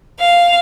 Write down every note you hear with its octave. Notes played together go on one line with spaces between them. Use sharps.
F5